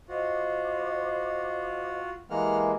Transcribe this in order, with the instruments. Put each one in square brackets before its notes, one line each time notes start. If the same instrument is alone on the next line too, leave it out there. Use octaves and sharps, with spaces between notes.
[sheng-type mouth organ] F4 F#4 [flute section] C5 D#5 D6
[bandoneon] E3 G#3 A#3 [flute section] G4 [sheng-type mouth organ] F#5 F6